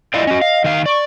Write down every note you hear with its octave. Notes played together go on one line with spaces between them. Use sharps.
E4 F4 D5 D#5
C#4 F#4
F5
D#3 F5
D5 C#6